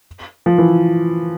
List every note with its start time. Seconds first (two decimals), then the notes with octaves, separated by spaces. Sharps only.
0.46 F3
0.58 E3